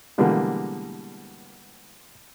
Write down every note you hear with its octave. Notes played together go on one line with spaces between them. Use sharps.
B2 D3 E3 G3 G#3 A#3